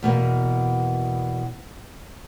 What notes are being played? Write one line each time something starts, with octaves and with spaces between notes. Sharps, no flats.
E2 B2 A#3